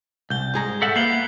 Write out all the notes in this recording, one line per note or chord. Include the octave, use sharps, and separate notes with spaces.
C2 G6 G7
G#2 G#4 A#5
A4 E5 F#5
A#3 B3 E5 F5 C7 F#7 G7